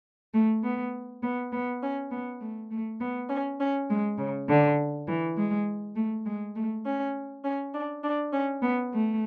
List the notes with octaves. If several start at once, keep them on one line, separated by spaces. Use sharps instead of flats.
A3
B3
B3
B3
C#4
B3
A3
A3
B3
C#4
C#4
G#3
C#3
D3
E3
G#3
A3
G#3
A3
C#4
C#4
D4
D4
C#4
B3
A3